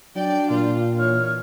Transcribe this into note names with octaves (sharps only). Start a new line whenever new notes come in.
F#3 D4 D5 G5
A#2 F4
E3 C#5 F6